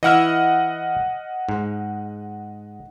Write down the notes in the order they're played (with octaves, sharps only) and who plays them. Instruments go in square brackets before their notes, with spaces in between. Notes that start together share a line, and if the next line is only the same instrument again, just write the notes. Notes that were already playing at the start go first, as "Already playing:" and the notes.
[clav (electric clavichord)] E3 E4 E5 [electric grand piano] D#5 F#5 F6
[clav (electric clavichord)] G#2